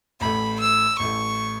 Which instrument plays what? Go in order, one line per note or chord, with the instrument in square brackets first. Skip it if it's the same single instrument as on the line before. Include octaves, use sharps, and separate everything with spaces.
[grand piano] A1 A2 A3 [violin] B5
[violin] E6
[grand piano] A1 A2 A3 [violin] C#6